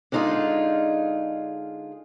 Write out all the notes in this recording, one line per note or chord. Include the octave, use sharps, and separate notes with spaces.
D3 G#3 D#4 F4 G#4